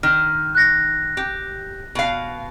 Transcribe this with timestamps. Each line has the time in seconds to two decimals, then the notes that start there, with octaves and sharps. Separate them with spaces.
0.03 D#3 F6
0.55 F#6 A#6
1.17 G4
1.95 B2 F5